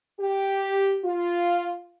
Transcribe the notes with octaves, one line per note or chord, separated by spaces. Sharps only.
G4
F4